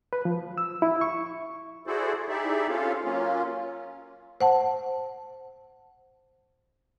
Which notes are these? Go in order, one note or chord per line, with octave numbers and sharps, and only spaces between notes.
B4
F3
E6
E4
C#6
E4 F#4 G#4 A4 C5 D5
D#4 E4 G4 G#4 D5 E5
C4 C#4 F4 A4 F5
F#3 A#3 C#4 F4
C5 F#5 A5